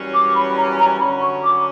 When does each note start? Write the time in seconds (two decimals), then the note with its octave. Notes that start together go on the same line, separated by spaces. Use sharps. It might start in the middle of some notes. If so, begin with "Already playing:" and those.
Already playing: F#2 E3 G3 C#4
0.14 D6
0.35 B5
0.57 A#5
0.78 A#5
0.99 F#2 D3 F#3 C#4 B5
1.22 C#6
1.43 D6